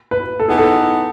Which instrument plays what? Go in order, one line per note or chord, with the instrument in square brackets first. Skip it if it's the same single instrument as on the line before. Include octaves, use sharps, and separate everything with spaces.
[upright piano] B4
A4
[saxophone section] E3 B3 D#4 [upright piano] G#4
[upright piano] A4